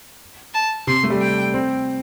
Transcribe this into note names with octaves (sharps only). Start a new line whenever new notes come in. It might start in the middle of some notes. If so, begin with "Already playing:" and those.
A5
C3 C6
A3
G3
G5
C4